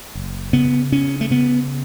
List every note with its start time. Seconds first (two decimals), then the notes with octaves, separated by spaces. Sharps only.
0.15 F#1
0.53 C#3 B3
0.92 C#3 C#4
1.21 A3
1.31 C#3 B3